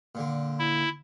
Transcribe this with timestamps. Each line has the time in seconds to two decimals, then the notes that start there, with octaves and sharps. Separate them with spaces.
0.15 A#2 D3
0.59 E4